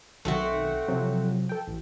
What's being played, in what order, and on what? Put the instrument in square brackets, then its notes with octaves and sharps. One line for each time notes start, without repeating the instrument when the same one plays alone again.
[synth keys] B1 D#3 [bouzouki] A3 C4 F#4
[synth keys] C3 F3 F#3
A4 G5
A1